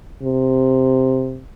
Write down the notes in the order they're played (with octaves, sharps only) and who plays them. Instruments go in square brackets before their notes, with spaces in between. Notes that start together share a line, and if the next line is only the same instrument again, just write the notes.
[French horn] C3